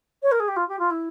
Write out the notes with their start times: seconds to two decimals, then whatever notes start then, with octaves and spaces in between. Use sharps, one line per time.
0.22 C#5
0.31 A#4
0.40 G#4
0.48 G4
0.56 F4
0.68 G4
0.79 F4
0.90 E4